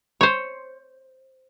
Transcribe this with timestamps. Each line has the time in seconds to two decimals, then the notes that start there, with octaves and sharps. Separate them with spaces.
0.21 C5 C#5